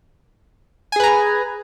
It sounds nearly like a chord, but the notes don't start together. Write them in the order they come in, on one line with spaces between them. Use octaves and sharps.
G#5 G#4 B4 A#5